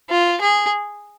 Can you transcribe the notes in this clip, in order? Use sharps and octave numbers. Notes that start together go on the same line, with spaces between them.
F4
G#4